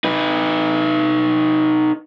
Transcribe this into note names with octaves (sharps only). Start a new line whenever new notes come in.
D#4 B4